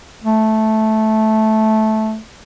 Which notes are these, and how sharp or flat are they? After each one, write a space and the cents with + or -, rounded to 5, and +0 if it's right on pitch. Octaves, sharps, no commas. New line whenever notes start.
A3 -10